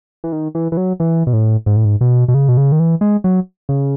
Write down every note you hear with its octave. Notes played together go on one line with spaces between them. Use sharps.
E3
D#3
E3
E3
F#3
E3
B2
A2
G#2
A2
G#2
B2
B2
C#3
B2
C#3
D#3
E3
G#3
F#3
C#3